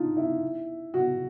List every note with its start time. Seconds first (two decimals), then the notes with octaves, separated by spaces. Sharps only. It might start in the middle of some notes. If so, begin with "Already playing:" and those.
Already playing: D4 D#4 F4
0.17 E4
0.94 F#4